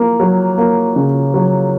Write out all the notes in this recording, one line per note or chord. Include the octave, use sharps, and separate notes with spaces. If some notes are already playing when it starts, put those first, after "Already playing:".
Already playing: A#3
F#3
A#3
C#3
F#3